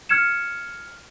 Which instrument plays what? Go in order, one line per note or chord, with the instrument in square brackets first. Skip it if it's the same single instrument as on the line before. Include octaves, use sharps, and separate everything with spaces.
[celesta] F6 G#6 C#7 E7